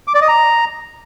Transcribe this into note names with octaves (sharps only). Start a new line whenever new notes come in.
D6
D5
D#5
A#5